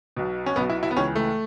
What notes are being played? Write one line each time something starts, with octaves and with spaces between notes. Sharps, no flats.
B1 B2
C#4
B1 B2 B3
E4
E4
B3
C#2 C#3 E3 C#4
A3